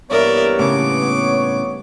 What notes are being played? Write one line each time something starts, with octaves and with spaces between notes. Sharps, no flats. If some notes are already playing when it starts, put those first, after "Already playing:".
G2 E3 A#3 B3 A#4 C#5 D5 E5
A2 C#3 D6